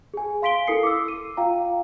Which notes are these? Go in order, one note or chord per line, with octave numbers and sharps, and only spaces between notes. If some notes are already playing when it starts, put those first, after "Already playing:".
G#4 G#5
F5 C6 B6 D7 G7
E4 A4 A#4 D#6 C7 C#7
D6 E6
D#7
F4 F5 G5 A#5